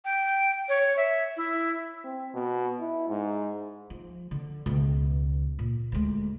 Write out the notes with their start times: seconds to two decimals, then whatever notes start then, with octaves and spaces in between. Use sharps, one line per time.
0.05 G5
0.69 C#5
0.97 E5
1.37 E4
2.05 C4
2.34 B2
2.80 E4
3.09 G#2
3.90 F3
4.31 D3
4.66 C#2 B2
5.59 A#2
5.92 D2 G#3